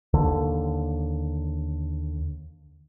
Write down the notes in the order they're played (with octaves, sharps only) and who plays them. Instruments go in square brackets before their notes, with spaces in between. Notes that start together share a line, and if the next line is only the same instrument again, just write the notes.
[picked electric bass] D#2 D3